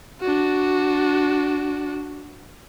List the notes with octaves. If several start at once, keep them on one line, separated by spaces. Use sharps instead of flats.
D4 F#4